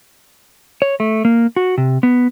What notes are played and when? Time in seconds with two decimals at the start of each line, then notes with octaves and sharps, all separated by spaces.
0.82 C#5
1.00 A3
1.25 A#3
1.56 F#4
1.78 C3
2.03 B3